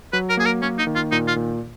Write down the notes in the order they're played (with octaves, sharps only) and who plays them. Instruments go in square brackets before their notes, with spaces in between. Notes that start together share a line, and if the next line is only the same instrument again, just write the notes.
[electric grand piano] F#3 [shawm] B4
[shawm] A#4
[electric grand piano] A#3 [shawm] G#4
[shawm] A#4
[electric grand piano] A#3 [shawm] C#4
[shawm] D#4
[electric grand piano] D#3
[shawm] F4
[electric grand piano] A#2 [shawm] D#4
[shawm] F4
[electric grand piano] A#2